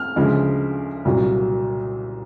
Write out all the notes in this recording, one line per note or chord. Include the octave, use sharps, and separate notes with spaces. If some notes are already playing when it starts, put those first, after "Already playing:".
Already playing: F6
D2 C#3 F3 G#3
C2 A#2 F#3